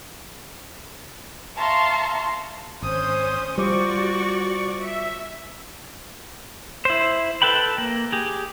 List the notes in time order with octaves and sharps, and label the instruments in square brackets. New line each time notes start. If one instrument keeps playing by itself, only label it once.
[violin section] E5 F5 A5 A#5 C6 C#6
[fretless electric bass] G#1 [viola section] C#4 C5 [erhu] D#6
[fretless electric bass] G3 [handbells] F4 C5 D6 [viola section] F#4 D5 [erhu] C#6
[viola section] E5
[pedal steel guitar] E4 C5
A4 B4 G5 B5
A#3
G4 G#4